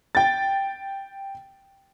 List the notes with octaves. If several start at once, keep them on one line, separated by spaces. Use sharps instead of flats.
G5 A6